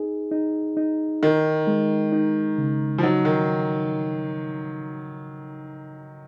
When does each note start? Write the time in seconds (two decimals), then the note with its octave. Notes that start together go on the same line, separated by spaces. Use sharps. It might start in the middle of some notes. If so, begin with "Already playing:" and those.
Already playing: D#4 G#4
0.31 D#4
0.77 D#4
1.23 D#3 D#4
1.67 G#3
2.12 D#4
2.58 C#3
2.98 F3
3.03 F#3 D#4
3.25 D#3